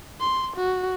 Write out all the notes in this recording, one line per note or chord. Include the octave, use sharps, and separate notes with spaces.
C6
F#4